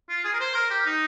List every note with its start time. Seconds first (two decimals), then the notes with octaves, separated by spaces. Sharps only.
0.09 F4
0.24 G#4
0.33 A#4
0.40 C5
0.55 A#4
0.70 G4
0.85 D#4